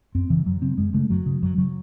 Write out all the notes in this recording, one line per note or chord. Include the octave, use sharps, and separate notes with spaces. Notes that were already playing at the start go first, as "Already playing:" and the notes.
F#2 C4
C#3 E3
F#2 F#3
C#3 C4
F#2 G#3
C#3 A3
F#2 F#3
C#3
F#2 F#3
C#3 F#3